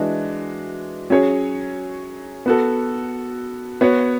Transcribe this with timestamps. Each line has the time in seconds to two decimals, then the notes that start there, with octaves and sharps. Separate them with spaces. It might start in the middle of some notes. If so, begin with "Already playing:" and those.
Already playing: E3 G#3 D4 F#4
1.10 F#3 C#4 G#4 C#5
2.46 B3 F#4 A4
3.81 B3 F#4 C#5